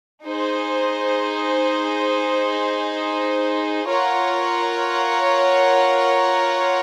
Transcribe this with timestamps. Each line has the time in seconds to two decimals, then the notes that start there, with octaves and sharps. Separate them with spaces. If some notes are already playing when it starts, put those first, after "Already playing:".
0.24 D#4 G#4 C5
3.87 F4 A#4 C#5 F#5